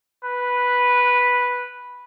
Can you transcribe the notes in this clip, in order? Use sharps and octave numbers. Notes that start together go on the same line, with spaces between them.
B4